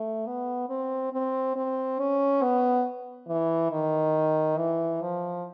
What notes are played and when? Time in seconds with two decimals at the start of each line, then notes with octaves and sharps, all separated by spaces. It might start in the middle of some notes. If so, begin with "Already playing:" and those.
Already playing: A3
0.27 B3
0.69 C4
1.13 C4
1.56 C4
1.99 C#4
2.42 B3
3.28 E3
3.71 D#3
4.57 E3
5.01 F3